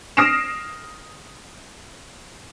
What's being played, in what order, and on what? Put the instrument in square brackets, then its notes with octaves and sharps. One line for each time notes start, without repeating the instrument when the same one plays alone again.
[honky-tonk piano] D#6 F6 A#6 C7 D7 E7